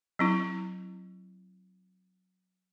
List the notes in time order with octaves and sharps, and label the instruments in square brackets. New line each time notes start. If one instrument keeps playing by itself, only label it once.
[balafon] F#3 C4 E4